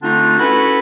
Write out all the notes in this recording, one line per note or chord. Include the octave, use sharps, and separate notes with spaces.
D3 A3 C4 D4 D#4 F4
C#4 E4 F#4 A4 B4 B5